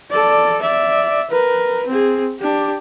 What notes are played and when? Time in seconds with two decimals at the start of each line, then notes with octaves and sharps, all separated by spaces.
0.11 A4 D5
0.62 D5 E5
1.31 A#4 B4
1.87 C4 G#4
2.40 D4 G4